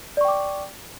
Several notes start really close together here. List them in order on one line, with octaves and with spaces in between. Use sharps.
D5 C#6 G5 D6